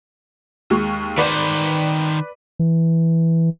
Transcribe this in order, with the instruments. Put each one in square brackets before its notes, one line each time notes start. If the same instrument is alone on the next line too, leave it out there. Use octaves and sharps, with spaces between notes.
[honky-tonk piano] D#2 G#3 C#6
[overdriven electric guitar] D#3 C5 [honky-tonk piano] B4 D5
[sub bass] E3